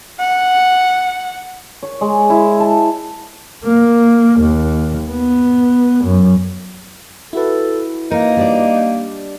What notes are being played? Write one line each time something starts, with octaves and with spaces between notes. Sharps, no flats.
F#5
C#5
G#3
E4
A5
A#3
D#2
B3
F#2
E4 F#4 A4 B4
A#3 D#4 A#4
G3 D4 D5